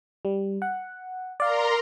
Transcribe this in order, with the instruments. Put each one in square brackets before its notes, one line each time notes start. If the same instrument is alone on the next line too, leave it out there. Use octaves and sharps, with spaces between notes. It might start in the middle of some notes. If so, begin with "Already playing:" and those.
[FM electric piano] G3
F#5
[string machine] A#4 A#5 C6 [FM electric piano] D5 F5